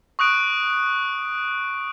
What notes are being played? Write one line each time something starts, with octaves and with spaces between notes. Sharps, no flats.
C#6 D#6 F#6 D7